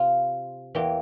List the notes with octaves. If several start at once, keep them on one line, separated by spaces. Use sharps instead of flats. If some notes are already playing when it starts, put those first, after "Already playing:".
Already playing: C3 F4
E2 E3 A#3 G4